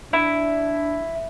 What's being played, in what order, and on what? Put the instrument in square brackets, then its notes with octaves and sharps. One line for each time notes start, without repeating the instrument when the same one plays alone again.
[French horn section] D4 [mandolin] E4